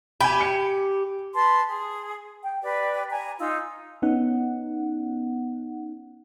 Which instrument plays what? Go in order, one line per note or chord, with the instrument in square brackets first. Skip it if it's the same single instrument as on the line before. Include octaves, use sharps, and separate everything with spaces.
[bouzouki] G4 [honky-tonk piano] G#5 B5
[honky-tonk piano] C#7
[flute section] B4 A5 C6
G#4
G5
G4 B4 D5
G#5 A#5
D#4 F4 E6
[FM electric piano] B3 C#4 D#4 F#5